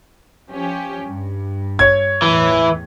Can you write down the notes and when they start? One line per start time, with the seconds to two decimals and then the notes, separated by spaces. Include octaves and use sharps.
0.49 F3 C#4 G4
1.05 G2
1.79 C#5 G#6
2.22 E2 A2 E3